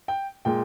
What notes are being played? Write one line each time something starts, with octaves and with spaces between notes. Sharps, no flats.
G5
A#2 G#3 G5